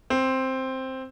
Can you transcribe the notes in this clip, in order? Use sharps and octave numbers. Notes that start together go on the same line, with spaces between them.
C4